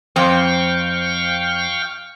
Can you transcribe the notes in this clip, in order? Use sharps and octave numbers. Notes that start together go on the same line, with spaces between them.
F2 C4 F5 G5 C#6